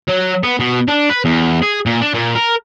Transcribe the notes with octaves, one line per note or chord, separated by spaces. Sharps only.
F#3
B3
B2
D4
B4
E2
G#4
A#2
D4
A#2
A#4